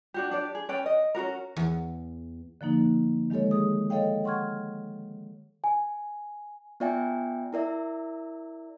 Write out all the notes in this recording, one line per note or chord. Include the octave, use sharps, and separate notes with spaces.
D4 F#4 G4
D4 G4 D5
G#4
C#4 B4 D5 G5
D#5
C#4 F4 F#4 A#4
E2
D3 F3 A#3 D#4
D#3 G#3 G4 A4 C#5
G#4 D#6
A4 C#5 D#5 F5 G5
F#5 C6 C#6 F6 G#6
G#5
B3 F4 D5 E5 G5 G#5
E4 A#4 D5 E5